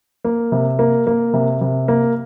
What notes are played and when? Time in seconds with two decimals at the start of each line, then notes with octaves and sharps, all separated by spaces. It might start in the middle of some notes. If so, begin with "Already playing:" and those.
0.24 A#3
0.52 C3
0.79 A#3
1.07 A#3
1.33 C3
1.61 C3
1.88 A#3